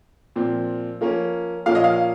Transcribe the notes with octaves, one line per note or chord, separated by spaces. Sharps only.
A#2 F3 C4
F3 A#3 C#4
A#2 F3 A#3 C#4 F5
D#5
F5